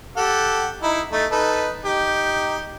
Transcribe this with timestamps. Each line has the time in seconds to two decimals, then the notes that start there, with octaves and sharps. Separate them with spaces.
0.17 G4 A4 F#5
0.82 D#4 E4
1.12 A3 D#4
1.31 D#4 A4 B4
1.85 D#4 G4